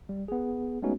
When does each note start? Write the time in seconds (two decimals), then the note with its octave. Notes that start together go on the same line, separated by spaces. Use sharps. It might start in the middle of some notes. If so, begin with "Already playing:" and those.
0.09 G3
0.28 B3 G#4
0.82 G#3 A3 B3 C#4 D#4 F#4